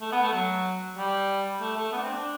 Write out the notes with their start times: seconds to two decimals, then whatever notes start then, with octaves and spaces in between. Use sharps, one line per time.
0.01 A3
0.12 B3
0.22 A3
0.34 F#3
0.97 G3
1.61 A3
1.76 A3
1.92 B3
1.98 D4
2.02 C4
2.14 D4